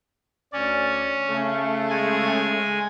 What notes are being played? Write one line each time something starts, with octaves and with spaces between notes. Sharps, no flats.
D2 C#4 D5
C#3 A3
G#3 G#5